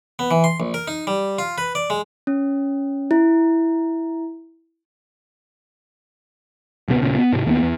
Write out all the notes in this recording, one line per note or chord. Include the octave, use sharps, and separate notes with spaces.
B3
E3
C6
A#1
A#4
D#4
G3
F4
B4
D5
G#3
C#4
E4
D#1 C3 A3 B3
D#1 A#2 C#3
B3
G#2 C3
D#2 A3 B3
E2